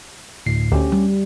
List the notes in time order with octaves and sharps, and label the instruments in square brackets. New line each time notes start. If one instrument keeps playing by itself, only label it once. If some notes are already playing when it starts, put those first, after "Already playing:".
[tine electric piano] D2 A2 C7
[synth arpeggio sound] D2 [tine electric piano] C#4 G4
[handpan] G3